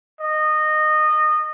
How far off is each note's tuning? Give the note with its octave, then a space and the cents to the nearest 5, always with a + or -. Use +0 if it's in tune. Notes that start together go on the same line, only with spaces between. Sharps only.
D#5 -20